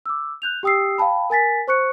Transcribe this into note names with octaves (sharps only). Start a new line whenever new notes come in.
D6 E6
F#6 G6 F7
G4 G5 D#6 E6 C7
F5 G5 A5 B5
A#4 G#5 A6 B6
C5 C#6 F#6 C#7